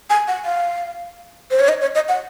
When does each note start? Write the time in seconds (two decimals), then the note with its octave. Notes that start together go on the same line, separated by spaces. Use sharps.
0.10 G#5
0.28 F#5
0.45 F5
1.51 C5
1.60 C#5
1.69 D#5
1.81 C#5
1.95 D#5
2.09 F#5